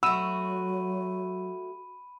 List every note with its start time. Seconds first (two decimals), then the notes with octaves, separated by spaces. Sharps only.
0.03 F#3 A3 F#4 B5 E6 D#7